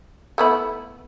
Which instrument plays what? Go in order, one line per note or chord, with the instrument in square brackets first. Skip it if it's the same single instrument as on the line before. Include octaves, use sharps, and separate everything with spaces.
[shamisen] A3 B3 E4